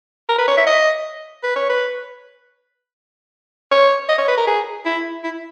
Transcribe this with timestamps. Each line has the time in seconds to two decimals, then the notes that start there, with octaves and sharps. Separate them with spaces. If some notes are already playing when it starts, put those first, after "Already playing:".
0.29 A#4
0.38 B4
0.48 C#5
0.57 E5
0.66 D#5
1.43 B4
1.56 C#5
1.70 B4
3.71 C#5
4.09 D#5
4.18 C#5
4.28 B4
4.38 A#4
4.47 G#4
4.86 E4
5.24 E4